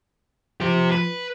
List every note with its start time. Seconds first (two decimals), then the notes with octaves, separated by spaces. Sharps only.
0.60 F3 G4 C5
0.92 B4